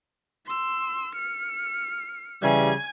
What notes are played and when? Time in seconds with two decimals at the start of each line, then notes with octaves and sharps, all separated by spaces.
0.46 C6 E6
1.15 F6 C#7
2.42 C#3 E3 G3 G#5 G#6